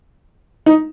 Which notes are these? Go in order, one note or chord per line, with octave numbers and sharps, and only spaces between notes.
D#4